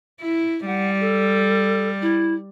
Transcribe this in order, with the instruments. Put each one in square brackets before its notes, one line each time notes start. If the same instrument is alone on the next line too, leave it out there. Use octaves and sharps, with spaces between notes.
[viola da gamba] E4
[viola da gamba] G3 [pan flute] F#5
[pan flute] A4
E4